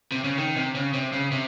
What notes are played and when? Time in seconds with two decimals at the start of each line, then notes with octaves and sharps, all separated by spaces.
0.12 C3
0.24 C#3
0.37 D#3
0.56 C3
0.75 C#3
0.93 C3
1.12 C#3
1.31 C3